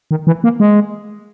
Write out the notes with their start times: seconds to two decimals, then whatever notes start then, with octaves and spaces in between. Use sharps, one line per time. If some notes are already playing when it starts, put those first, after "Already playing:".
0.11 D#3
0.27 E3
0.44 A#3
0.60 G#3